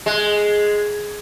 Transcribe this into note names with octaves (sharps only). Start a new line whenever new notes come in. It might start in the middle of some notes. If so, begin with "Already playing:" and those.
G#3